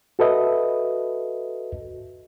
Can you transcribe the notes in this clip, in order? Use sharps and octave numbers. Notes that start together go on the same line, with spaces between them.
F#4 A4 B4 D#5 E5